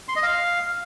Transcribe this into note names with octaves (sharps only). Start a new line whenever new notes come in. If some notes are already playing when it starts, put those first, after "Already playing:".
C6
D#5
F5